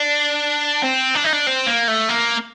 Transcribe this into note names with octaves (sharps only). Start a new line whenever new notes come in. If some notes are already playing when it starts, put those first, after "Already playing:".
Already playing: D4
C4
D4
D#4
D4
C4
A#3
A3
A#3